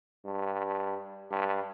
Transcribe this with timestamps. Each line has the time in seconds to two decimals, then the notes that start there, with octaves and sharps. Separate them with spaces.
0.25 G2
1.31 G2